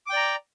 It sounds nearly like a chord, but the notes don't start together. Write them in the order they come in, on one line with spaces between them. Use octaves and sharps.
D6 G5 D5 A#5